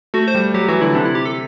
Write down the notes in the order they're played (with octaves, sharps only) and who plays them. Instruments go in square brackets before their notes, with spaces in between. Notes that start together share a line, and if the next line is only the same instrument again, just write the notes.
[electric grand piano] A3 [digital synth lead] F#4
[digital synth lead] C5
[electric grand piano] G3
[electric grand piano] F#3 [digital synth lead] G4
[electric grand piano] E3 [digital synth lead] F#4
[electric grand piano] D3 [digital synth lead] E4
[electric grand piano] C3 [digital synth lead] D4
[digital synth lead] E4
G4
A4